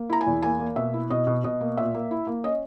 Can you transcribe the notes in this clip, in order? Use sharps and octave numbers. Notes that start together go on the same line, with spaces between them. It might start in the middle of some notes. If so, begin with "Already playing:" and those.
Already playing: A#3
E4 A#5
G#5
E2
A#3 G#5
A#3
B2 E5
E4
B2 D#5
B2
B2 D#5
A#3
A#2 E5
A#3
E4
A#3
C#4 D#5